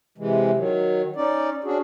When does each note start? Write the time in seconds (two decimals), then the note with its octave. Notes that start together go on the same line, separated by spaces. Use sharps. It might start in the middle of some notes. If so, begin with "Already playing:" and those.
0.18 C3 E3 G#3
0.56 D#3 F#3
1.16 C#4 D#4 D5
1.64 C#4 D4 F#4 G#4